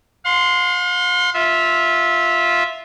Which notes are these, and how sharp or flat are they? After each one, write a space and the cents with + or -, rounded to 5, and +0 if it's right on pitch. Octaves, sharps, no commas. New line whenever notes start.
F5 +40 C6 -5
F4 +0 E5 -15